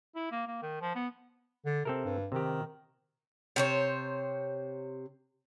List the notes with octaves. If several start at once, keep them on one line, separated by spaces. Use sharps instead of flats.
E4
A#3
A#3
D#3
F3
B3
D3
C3 C4 A4 A#4
G2
C3 D#3 G4
C3 C5 C#5